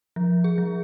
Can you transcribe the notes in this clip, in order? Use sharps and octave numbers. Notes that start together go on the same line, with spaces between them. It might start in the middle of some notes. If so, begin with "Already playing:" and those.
F3
G#4
F3